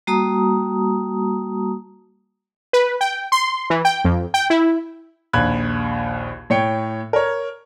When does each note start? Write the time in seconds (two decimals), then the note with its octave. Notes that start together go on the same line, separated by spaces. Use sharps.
0.07 G3 A#3 F#4 A5 A#5 D#6
2.73 B4
3.01 G5
3.32 C6
3.70 E3
3.85 G5
4.05 F2
4.34 G5
4.50 E4
5.33 A#1 D#2 B5 F#6 G#6
6.50 A2 C#5 G5 C#7
7.13 A#4 C#5